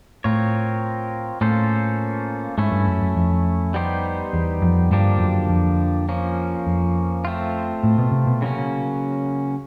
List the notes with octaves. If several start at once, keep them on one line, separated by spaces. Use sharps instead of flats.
A2 C4 F4 A#4 C#5
A2 A#3 C#4 F4 A4 C5
G#2 A3 C#4 E4
G2
F#2
F#2
F2
G3 B3 D#4 G4 C5
E2
F2
G2 D3 F3 A#3 D4 G4
F#2
F2
F3 A#3 C#4
F2
A3 C4 F4
A2
B2
C3
B2
C#3 F#3 A#3 C#4